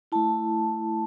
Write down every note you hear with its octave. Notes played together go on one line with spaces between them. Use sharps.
A3 E4 A5